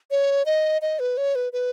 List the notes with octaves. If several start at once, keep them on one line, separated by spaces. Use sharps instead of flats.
C#5
D#5
D#5
B4
C#5
B4
B4